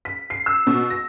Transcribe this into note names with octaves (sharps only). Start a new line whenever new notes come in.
B6
C7
E6
B2
A#6